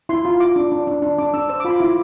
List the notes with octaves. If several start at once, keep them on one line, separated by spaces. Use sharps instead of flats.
E4 C6
F4 C6
F4 D6
D4
D4
D4
D4
D4 D6
D4 E6
C5 E6
D6
F4 B5
C6
E4 D6